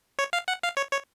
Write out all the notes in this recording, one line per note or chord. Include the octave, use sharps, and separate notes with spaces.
C#5
F5
F#5
F5
C#5
C#5